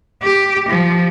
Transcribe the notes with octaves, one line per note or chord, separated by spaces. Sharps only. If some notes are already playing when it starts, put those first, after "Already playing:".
G4
F3